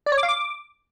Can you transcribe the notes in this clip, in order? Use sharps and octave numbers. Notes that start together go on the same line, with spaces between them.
D5
C#5
D6
F5
D6